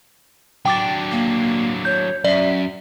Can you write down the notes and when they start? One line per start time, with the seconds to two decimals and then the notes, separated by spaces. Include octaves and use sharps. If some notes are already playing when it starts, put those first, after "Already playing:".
0.65 F#3 D4 G5 D6 A6
1.11 A#3
1.85 C#5 G6
2.24 F#2 D5 E5